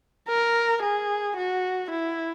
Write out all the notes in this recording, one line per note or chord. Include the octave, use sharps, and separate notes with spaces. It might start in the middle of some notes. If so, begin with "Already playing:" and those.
A#4
G#4
F#4
E4